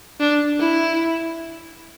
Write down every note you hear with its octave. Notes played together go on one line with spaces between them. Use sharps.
D4
E4